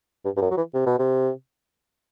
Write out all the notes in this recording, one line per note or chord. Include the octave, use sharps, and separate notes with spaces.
G2
G2
F#2
F#3
E3
C3
B2
C3